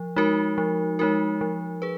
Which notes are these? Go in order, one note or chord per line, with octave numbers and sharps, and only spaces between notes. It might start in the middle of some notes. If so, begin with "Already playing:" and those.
Already playing: F3
G#3 D#4 F#4 A#4
F3
G#3 D#4 F#4 A#4
F3
G#4 B4